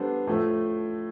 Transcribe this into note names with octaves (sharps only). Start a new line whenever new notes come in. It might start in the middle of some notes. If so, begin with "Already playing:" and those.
Already playing: G3 B3 D4 A4 C5
A2 F3 A3